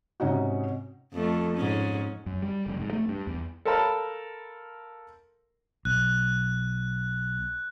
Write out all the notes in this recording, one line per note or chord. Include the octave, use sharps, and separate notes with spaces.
G#2 C3 C#4 D#4 F#4
F2 A3
G#2 C#4
F#2
G3
F1
G#2
A3
G2
E2
A4 A#4 C5 F5 A5 B5
B1 F#6